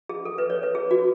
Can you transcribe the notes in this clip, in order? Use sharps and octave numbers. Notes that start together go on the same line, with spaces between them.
G#4
A4
B4
C#5
B4
G#4
F#4